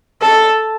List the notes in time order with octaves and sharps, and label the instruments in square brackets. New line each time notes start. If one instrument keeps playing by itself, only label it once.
[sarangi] A4